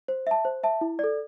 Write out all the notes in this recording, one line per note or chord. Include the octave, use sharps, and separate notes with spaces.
C5
E5 A5
C5
E5 A5
E4
A4 D5